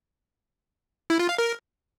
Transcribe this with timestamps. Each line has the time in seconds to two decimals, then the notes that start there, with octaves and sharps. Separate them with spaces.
1.10 E4
1.19 F4
1.29 F5
1.38 A#4